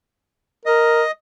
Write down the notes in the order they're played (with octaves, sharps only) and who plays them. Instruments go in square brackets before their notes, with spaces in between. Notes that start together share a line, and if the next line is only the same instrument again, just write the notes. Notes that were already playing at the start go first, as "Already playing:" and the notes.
[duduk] A#4 [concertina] D#5